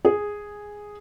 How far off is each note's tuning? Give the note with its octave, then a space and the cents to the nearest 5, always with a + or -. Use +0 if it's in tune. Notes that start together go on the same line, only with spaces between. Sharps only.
G#4 -5